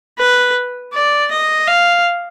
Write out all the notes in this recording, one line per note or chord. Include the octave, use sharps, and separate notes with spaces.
B4
D5
D#5
F5